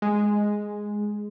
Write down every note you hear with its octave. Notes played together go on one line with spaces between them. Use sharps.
G#3